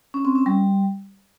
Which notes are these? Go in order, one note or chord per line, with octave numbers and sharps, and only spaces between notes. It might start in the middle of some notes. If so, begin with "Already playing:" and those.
C#4
C4
C#4
G3